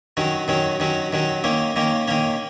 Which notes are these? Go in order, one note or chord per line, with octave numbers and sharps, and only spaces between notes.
D#3 F#3 C#4
D#3 F#3 C#4
D#3 F#3 C#4
D#3 F#3 C#4
D#3 A#3 C#4
D#3 A#3 C#4
D#3 A#3 C#4